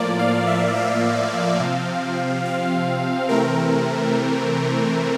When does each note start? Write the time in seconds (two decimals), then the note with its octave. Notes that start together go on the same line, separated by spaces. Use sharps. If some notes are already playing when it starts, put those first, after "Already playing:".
Already playing: A2 F3 A#3 D5
0.19 F5
0.47 E5
0.76 F5
1.60 C3 F3 C4
2.45 F5
3.29 C3 E3 A3 C4 A#4